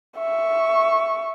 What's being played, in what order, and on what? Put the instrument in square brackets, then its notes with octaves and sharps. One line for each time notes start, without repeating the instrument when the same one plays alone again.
[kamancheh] E5 C#6